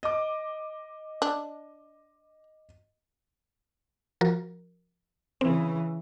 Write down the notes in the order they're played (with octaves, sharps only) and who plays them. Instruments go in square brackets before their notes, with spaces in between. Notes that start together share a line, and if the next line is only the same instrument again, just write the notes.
[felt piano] D#5 D6
[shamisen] D4
[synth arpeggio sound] F3 F#4 A#4
[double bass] C#3 E3 [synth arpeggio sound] C4